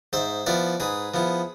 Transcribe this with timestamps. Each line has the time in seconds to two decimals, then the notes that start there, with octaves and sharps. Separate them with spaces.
0.13 G#2 C5 E5
0.46 F3 B3 E4 B4 D5
0.80 G#2 G#4 B4
1.14 F3 B3 E4